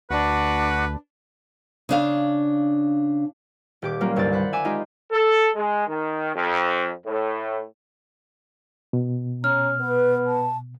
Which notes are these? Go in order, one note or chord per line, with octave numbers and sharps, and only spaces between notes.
D2 D4 F#4 B4 F#5
C#3 D4 F5
D#1 G4 D6
F#3 G3 A#3 C#4 F4
G1 C2 G2 C5 D5 A6
C5 F#5 B5
E5 G#5 D6 E7
G#3 D#4 F4 G4
A4
G#3
D#3
F2
A2
B2
C#4 A#5 F6
B3 B4
A5